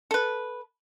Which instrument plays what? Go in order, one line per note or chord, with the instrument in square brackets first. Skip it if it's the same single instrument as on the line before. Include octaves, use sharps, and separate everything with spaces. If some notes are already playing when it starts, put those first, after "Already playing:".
[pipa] A4 B4